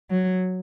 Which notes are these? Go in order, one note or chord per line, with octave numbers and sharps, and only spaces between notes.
F#3